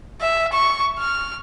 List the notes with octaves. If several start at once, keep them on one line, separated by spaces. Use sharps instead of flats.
E5
C#6
F6